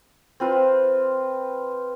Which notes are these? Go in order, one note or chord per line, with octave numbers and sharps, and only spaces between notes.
C4 F4 B4